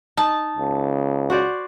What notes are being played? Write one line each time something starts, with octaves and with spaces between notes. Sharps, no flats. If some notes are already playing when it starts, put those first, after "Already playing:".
D#4 A5
C#2
F#4 C5 D5